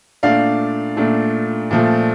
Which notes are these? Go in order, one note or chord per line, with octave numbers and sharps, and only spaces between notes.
A#2 A3 D4 D5 F5
A#2 A3 D4
A#2 F3 A3